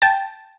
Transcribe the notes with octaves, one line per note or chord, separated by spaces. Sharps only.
G5 A5